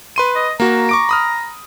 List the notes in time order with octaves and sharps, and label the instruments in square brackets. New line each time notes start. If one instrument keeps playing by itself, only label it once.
[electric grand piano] B4 C6 D#7
[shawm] D#5
[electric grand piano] A#3 F#4 [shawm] A#5
[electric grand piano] C#6 D6 D7
B5 D#6 F6